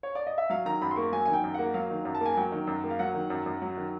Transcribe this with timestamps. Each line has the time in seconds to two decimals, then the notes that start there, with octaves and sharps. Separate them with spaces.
0.03 C#5
0.15 D5
0.27 D#5
0.38 E5
0.50 F#3 F5
0.65 D#3 A#5
0.81 F#2 B5
0.91 C6
0.96 A#3 C#6
1.12 F#3 G#5
1.26 D#3 G#5
1.33 G5
1.43 F#2
1.54 A#3 F#5
1.74 F#3 F5
1.91 D#3
2.05 F#2
2.15 A5
2.21 A#3 G#5
2.37 F#3 G5
2.52 D#3
2.67 F#2
2.84 A#3
2.90 F5
2.99 F#3 F#5
3.14 D#3
3.30 F#2
3.46 F#2
3.62 F#3
3.77 D#3